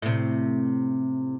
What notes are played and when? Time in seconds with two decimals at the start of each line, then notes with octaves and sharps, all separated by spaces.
0.02 A2 C3